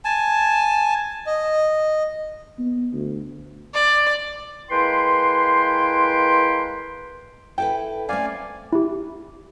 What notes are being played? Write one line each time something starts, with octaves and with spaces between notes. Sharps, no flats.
G#5 A5
D#5
B3
D2
D5
G#3 A#3 E4 B4 G5 C6
E4 A4 B4 G5
A3 C4 C#4 D5 F5 G#5
E4 G4